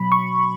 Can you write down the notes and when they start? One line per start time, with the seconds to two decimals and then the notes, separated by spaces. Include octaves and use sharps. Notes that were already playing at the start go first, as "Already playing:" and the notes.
Already playing: B2 F#3 B5
0.12 C#6